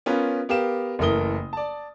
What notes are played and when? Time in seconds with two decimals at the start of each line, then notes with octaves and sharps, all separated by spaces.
0.06 B3 C#4 F4 A#4 B4
0.49 B3 G4 A#4 F5 E7
0.99 F#1 E3 A3 A#4 D#6 G7
1.53 D5 A5